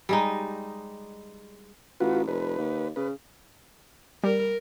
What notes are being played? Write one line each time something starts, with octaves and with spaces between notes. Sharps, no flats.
G3 G#3 D#4
A1 F4 F#4 B4
F1 B4
D#2
C#3 B4
G3 A#4